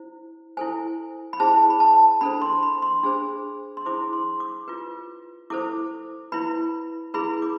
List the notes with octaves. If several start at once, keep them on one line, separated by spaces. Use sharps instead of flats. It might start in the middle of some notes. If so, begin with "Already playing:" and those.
Already playing: E4 C5
E4 A4 C5 G#5
B5
E4 G#4 C5 A5
B5
A5
D4 A4 C5 B5
C6
B5
C6
D4 G#4 C5
C6
E4 G#4 C5 D6
C6
D6
F4 B4
E4 A4 C5 D6
E4 B4 B5
E4 G#4 B4 B5
D6